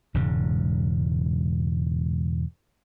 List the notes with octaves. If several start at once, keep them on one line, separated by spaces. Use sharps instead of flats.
E1 G#2 C#3